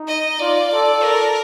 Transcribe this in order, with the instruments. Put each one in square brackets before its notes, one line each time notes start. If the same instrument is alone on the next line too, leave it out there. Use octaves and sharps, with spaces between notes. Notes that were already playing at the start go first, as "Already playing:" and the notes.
Already playing: [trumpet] D#4
[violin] D#5
[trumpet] F4 [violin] D5
[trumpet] A4
[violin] A#4